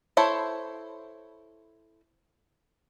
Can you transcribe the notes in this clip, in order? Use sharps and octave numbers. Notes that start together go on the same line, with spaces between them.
E4 A4 C5 C#5